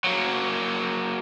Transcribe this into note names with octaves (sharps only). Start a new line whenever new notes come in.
F#3 A#3